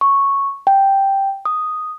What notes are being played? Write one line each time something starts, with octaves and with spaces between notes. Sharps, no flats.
C#6
G5
D#6